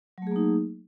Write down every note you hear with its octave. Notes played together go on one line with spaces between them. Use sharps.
F#3 A3 A#3 D#4 G#4